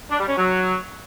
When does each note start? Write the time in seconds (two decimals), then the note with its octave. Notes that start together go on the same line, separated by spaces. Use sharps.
0.10 D4
0.19 G3
0.28 C#4
0.37 F#3